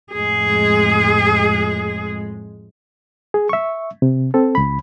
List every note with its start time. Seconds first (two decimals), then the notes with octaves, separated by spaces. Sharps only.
0.13 F2 A2 G#3 G#4
3.34 G#4
3.49 E5 C#6
4.02 C3
4.34 C4 A4
4.55 C#2 B5